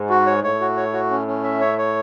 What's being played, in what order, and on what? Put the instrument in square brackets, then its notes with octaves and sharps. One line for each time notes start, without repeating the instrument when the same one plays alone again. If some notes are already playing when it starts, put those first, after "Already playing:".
Already playing: [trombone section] G#2
[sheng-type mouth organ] F#4
C#5
[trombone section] A2 [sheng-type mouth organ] C#5
[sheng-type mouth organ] F#4
C#5
F#4
C#4
C#4
E5
C#5
C#5